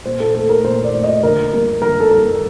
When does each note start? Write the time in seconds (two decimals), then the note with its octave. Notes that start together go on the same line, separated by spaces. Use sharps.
0.06 A#2 C5
0.20 A4
0.34 A3 A4
0.49 A#4
0.64 A#2 C5
0.84 D5
0.94 A3
1.04 D#5
1.23 D3 A#4
1.52 G3 A#3
1.82 D3 A#4
2.00 A4
2.11 G3 A#3 A#4